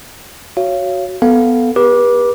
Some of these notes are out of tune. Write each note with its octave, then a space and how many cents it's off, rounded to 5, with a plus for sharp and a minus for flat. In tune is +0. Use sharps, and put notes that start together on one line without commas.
F#4 +0 C#5 +0 F5 -30
B3 +0 A4 +0 F5 +0
G4 +25 B4 -35 D6 +0